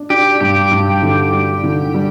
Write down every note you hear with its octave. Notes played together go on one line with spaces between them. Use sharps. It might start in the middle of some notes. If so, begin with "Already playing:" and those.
Already playing: D4
D4 G4
G2 G4
G2
D3
G3
D3
G3